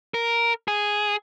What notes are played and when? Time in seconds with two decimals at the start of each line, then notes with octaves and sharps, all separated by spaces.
0.14 A#4
0.68 G#4